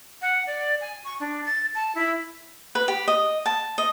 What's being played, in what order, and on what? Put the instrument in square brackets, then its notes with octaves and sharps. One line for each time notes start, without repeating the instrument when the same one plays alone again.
[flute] F#5
D5
G#5
C#6
D4
A6
A5
E4
[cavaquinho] B4
G4
D#5
A5
D#5